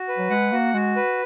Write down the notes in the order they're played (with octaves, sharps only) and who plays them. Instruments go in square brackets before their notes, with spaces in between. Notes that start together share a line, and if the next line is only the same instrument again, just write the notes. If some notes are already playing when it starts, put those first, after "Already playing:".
Already playing: [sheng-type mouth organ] F#4
B4
[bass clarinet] F#3
[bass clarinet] G#3 [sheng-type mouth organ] F#5
[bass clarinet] A#3 [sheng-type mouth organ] F#4
[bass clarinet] G#3 [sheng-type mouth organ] F#4
[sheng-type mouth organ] B4